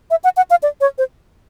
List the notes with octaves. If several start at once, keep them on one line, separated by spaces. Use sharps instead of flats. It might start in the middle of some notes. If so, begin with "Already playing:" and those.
E5
F#5
F#5
F5
D5
C#5
C5